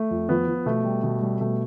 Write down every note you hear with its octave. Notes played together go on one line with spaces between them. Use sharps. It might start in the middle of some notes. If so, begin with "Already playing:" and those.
Already playing: A3
F2
F3 B3
F3
B2 A3
G3
B2
G3
B2 A3